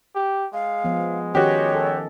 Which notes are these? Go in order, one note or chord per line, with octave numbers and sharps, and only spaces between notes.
G4
G#3 F5
F3 B3
D#3 C#4 F#4 G4 C#5 D#5
A4